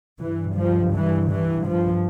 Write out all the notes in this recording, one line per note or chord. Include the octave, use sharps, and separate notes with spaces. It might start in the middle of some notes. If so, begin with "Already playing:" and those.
G2 E3
F3
E3
E3
F3